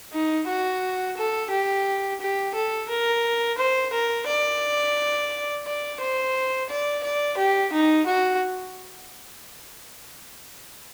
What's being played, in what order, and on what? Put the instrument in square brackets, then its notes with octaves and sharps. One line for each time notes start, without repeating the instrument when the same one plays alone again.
[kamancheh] D#4
F#4
A4
G4
G4
A4
A#4
C5
A#4
D5
D5
C5
D5
D5
G4
D#4
F#4